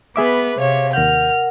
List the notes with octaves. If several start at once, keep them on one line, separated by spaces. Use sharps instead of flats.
B3 G#4 B4 E5 D6
C3 C#5 F5
D#2 A#4 F#5 F6 G6